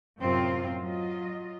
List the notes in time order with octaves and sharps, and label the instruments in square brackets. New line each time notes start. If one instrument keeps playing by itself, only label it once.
[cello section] F#2 A2 C3 C4 F4
F#3 F4 D#5